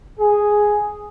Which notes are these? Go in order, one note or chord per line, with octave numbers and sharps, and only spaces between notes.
G#4